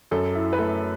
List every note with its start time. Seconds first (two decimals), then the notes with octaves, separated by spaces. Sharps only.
0.11 F#2 A4
0.35 E4
0.53 B4
0.59 A3 A4